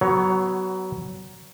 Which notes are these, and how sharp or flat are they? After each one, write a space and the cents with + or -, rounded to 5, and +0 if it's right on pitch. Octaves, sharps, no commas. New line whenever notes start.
F#3 +20 B3 +0 C#5 +5